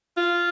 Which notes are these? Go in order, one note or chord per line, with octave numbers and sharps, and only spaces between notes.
F4